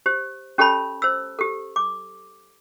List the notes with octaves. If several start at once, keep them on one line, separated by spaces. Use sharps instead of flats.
G4 C5
C#4 G4 A4 C#5 A5 B5
C5 E6
G4 A4
D6